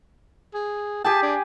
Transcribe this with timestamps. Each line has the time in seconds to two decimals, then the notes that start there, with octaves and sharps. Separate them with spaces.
0.54 G#4
1.04 G4 G#4 G5 A5
1.22 D4